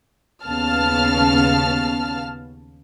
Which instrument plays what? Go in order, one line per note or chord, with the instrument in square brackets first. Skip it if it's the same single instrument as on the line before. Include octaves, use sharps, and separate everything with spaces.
[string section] D#2 C#3 B3 F5 A5 F6